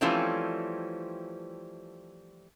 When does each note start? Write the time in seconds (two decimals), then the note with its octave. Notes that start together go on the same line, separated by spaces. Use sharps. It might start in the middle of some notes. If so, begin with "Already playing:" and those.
0.01 E3 F3 G3 A3 C4 C#4